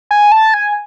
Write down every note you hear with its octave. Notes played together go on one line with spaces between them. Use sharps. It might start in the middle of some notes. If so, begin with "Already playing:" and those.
G#5
A5
G#5